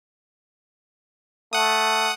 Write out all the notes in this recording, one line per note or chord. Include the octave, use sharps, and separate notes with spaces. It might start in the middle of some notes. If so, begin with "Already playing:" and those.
A3 F#5 D#6